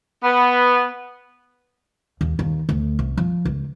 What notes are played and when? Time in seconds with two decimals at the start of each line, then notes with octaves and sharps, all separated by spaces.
0.22 B3
2.21 D#2
2.39 D#2
2.69 D2
2.99 C2
3.17 F3
3.45 C#2